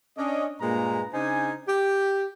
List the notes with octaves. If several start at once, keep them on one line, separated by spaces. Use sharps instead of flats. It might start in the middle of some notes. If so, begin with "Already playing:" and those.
C#4 D4 D#5
G2 A#2 G#3 A#3 B4 A#5
C#3 D4 D#4 C5 G#5
G4